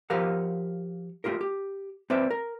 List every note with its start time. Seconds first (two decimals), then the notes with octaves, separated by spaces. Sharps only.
0.10 F3 G4 A#4 F5 F#5
1.24 A3 F4 G4 A#4
1.41 G4
2.10 C4 B4 D5 E5
2.31 A#4